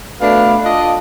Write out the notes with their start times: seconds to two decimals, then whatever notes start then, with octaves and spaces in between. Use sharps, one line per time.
0.21 B2 A3 D4 F5 B5
0.64 D4 F4 D#5